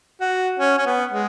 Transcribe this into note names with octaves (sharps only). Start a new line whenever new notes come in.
F#4
C#4
C#4
B3
G#3